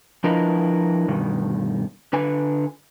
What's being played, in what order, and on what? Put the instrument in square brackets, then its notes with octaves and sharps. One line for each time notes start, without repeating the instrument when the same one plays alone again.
[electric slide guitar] F3 D4 E4 A#4 B4 D#5
G2 B2 D#3
D3 B4 G#5